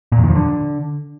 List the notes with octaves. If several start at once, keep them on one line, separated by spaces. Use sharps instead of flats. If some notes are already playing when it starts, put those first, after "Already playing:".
A#2
E2
D#3
F3
D3